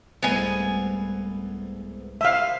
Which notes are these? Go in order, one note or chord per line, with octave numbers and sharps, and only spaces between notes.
C2 G#2 A3 B3 G#5
C3 C5 E5 F5 D#6